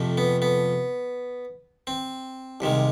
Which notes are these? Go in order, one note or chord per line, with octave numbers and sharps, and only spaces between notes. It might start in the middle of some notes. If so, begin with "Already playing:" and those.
Already playing: F2 C3 F3 A3
B3
B3
C4
C2 C3 D#3 G#3